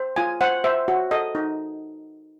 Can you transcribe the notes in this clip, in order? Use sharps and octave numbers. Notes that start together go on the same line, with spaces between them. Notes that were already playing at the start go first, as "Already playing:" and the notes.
Already playing: C5
F4 G#5
C5 F#5
C5 E5
F#4
A4 D#5
D#4